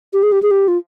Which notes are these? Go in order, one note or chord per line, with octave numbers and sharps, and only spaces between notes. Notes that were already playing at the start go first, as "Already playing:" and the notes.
G4
G#4
G4
G#4
G4
F4